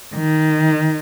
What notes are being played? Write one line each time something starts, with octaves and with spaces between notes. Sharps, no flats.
D#3